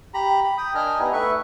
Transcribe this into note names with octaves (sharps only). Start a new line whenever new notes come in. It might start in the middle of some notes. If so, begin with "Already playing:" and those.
G4 A#5 B5
B5
G5 D#6
D4 A#4 D#5 G#5 A#5
B3 D#4 E4 G4
A3 B4 E5 C#6